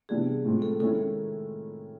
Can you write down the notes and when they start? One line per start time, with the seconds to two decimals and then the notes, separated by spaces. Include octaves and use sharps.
0.09 C3 E3 G3 B3 D4 G#4
0.45 A2 F3 G#3 C4
0.62 A4
0.80 D#3 G#3 C#4 E4 A4